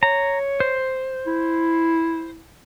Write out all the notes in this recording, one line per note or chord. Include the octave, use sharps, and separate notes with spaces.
C#5 A#5
C5
E4